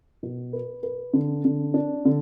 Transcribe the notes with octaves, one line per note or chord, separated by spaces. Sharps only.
B2
B4
B4
D3
D3
D4
D3